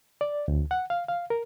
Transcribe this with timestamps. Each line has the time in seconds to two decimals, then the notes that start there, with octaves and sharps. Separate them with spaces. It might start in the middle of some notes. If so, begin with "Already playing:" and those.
0.21 D5
0.48 D2
0.71 F#5
0.90 F5
1.08 F5
1.30 A#4